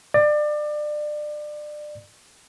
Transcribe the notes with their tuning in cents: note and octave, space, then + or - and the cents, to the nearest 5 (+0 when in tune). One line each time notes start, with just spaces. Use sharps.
D5 +30